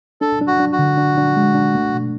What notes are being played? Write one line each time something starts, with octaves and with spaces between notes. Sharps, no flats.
D4 A4
D4
F#4
D4
F#4
D3
D4
D4
G#3
D4
A3
B2